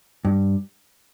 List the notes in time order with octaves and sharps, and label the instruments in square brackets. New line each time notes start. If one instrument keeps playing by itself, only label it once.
[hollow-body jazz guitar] G2